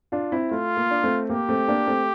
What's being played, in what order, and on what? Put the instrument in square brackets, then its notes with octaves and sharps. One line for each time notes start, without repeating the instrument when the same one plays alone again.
[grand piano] D4 F4
C4 E4
[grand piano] A3 [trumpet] F4
[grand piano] A#3
D4
A3 C4
[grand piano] A#3 [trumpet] G4
[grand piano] A3 C4
A#3 D4
A3 C4